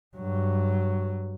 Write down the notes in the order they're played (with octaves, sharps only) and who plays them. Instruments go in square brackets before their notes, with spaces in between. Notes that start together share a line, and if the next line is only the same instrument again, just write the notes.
[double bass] G2 F#3